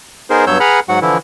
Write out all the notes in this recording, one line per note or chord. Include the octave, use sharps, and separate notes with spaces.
B3 D#4 G#4 A#4 C5
G2 F#3 B3 C#5 E6 G6
G#4 B4 F#5 A#5 B5 F6
G#2 F#3 F#4 F#5
D3 E3 F3 E4